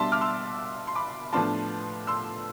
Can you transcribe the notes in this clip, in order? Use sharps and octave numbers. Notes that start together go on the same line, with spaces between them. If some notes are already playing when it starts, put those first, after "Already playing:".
Already playing: B2 G3 D4 E5 A5 C6
D6 F6
C6 E6
C6
B5 D6
A2 F3 B3 D4 F4 A5 C6
C6 E6